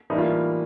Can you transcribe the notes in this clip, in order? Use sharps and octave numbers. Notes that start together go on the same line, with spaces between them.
A2 E3 G3 A#3 D#4
F4